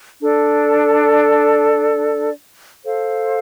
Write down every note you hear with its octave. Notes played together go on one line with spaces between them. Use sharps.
D4 A4 D5
A4 C5 F5